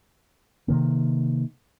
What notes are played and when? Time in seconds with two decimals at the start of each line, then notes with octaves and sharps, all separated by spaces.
0.68 C3 D#3 A#3